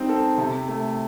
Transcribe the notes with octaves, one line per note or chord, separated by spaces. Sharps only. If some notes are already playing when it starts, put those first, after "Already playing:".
Already playing: G3 C4 D#4
A4
C3
A3